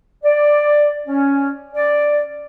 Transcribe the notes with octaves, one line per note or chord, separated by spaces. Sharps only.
D5
C#4
D5